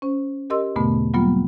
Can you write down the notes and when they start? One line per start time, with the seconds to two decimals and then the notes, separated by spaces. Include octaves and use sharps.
0.02 C#4 C5
0.50 G4 A#4 D#5 C6 E6
0.76 E2 G#2 B2 D3 A3 B3
1.14 F#3 G3 A#3 B3 F4